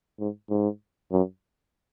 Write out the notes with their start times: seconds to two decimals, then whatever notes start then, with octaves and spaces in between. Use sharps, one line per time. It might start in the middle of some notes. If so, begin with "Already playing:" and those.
0.19 G#2
0.50 G#2
1.12 F#2